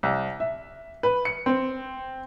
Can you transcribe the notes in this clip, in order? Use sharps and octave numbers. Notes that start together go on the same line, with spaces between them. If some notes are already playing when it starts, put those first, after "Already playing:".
C2
E5
B4
C#7
C4